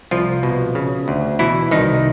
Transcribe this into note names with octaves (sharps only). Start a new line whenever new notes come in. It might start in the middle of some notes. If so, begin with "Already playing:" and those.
C2 F3 F4
B2
C#3
D2
B2 E3 E4
C2 D#3 D#4